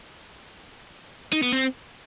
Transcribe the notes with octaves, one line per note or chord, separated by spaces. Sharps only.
D#4
B3
C4